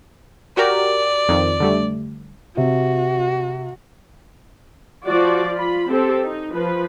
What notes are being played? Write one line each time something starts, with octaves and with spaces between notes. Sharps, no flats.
F#4 G4 A#4 D5
F2 D#3
D3 G3 A3
C3 F#4
F3 F#4 D5
F4 B5
C4 G4 A4
D#4
F3 B4